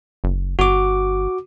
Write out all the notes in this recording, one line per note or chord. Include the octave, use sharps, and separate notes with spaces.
F#1
G1 F#4 D6